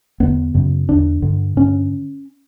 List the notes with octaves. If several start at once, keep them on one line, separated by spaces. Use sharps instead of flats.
E2 D3 B3
F#2 C#3
E2 D3 D4
G2 D3
G2 D3 C#4